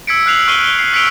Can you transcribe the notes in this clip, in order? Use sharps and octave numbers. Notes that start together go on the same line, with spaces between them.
E6 G#6 B6 C#7 D7
F6 F#6 C7 F7 F#7
C#6 F6 F#6 C7 D#7 G7
G7
C7
E6 B6 C#7 D7 F7 G7